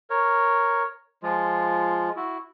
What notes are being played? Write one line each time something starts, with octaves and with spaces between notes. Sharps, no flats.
A#4 C#5
F3 G#3 F4
E4 F#4